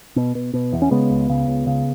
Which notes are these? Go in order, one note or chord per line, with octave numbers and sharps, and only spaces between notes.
B2
B2
B2
E2
C#4
C#3 G#3 B3
C#2
C#3
C#2
C#3